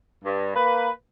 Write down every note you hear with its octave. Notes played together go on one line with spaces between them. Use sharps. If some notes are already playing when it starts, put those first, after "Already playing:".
G2
A#3 B4